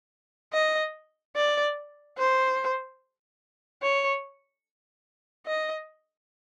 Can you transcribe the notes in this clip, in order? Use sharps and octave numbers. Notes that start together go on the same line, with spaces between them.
D#5
D5
C5
C#5
D#5